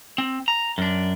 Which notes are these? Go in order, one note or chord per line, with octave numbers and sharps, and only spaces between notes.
C4
A#5
F#2 D4